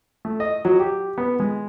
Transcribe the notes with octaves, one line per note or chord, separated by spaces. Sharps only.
A3
D#5
F#3
G4
B3
G#3